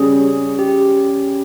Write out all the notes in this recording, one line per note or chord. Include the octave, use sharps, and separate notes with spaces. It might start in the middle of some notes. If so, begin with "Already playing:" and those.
Already playing: C#3 G3 C#4 G4 G#4
G4